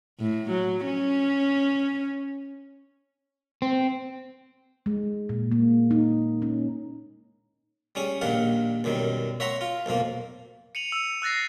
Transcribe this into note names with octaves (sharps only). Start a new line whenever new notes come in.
A2
F#3
C#4
C4
G#3
A#2
A#3
D#4
C#4
G3 C#4 G#4
A#1 D#3 G3 F5 F#5
B1 F#2 D#3 G3
C#5 E5 F#5 A#5 C6
F4
B1 F2 F3 A#3
C#7 D#7 F7 F#7
E6
E6 F#6 A6 A#6 C7